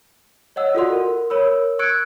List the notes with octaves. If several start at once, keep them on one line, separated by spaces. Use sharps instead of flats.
C#5 D#5 F#5 E6
F4 F#4 A4 D5 F#5 C6
A#4
A#4 C#5 B5 E6
C#6 E6 F#6 G#6 C#7 D7